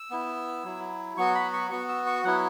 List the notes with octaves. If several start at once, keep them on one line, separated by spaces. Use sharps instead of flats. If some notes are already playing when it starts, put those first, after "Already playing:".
Already playing: E6
B3 E4
F#3 E4
F#3 B3 F#4 C#6
B5
C#6
B3 F#4 C#6
E6
C#6
F#3 B3 E4 F#5